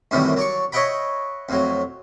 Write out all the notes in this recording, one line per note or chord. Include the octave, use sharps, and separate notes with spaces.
F#2 A2 C3 D#3 E3 G3
F#3 D5 C#6
C#5 D#5 E5 F#5 G5 B5
F2 A2 F#3